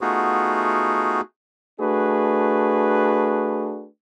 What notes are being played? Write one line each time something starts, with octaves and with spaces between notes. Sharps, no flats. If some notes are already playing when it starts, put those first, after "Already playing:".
A3 B3 D#4 F4 F#4 G#4
A3 D4 F#4 G#4 B4